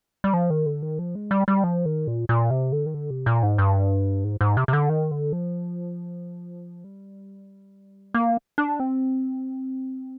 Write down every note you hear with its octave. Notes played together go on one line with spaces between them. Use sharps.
G3
F3
D#3
D3
D#3
F3
G#3
G3
G3
F3
D#3
A#2
A#2
C3
D3
D#3
D3
C3
A#2
G#2
G2
G#2
G#2
C3
C3
D3
D#3
D3
F3
G3
A#3
D4
C4